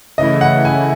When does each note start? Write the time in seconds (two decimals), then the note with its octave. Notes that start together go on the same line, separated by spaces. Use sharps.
0.18 C#3 E3 A3 E4 D#5
0.41 F#5
0.65 G#5